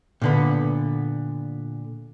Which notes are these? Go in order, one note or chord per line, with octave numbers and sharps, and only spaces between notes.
A#2 D3 B3